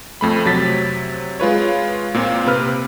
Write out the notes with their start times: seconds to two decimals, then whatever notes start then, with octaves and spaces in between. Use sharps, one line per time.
0.21 F2 A3 B5
0.45 C3 F#3 A6 B6
1.40 G#3 F4 B4 C#5
2.14 A#2 A#3 C4 F4
2.47 C3 B4 F6